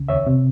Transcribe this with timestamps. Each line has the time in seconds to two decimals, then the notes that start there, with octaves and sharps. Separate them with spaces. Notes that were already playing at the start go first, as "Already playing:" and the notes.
Already playing: C2 C#3
0.09 D#2 C#5 E5
0.27 C3